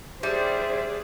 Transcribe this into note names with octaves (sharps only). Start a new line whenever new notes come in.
G3 D4 G#4 C5 E5